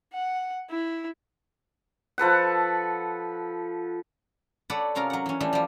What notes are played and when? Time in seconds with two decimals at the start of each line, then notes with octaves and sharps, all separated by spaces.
0.13 F#5
0.70 E4
2.18 F3 A4 B4 F#5
4.70 A4 B4 C#5 D5 F#5 A5
4.95 C3 C#4 F4 A#4 A#5
5.10 F#3 F#5
5.26 E3 C#4
5.41 E3 G3 A3 D4
5.53 F3 G3